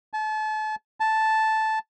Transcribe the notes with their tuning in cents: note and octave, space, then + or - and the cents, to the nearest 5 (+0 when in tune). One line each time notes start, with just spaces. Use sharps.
A5 -35
A5 -5